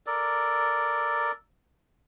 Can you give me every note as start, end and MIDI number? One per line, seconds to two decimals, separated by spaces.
0.06 1.32 69
0.06 1.32 70
0.06 1.32 74